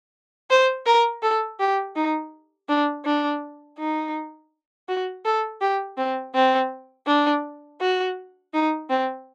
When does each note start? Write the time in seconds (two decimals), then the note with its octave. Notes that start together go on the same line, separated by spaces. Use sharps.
0.50 C5
0.86 A#4
1.22 A4
1.60 G4
1.96 D#4
2.69 D4
3.05 D4
3.79 D#4
4.89 F#4
5.25 A4
5.61 G4
5.98 C4
6.35 C4
7.07 D4
7.81 F#4
8.53 D#4
8.90 C4